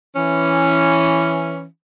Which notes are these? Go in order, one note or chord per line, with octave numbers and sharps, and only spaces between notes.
E3 C#4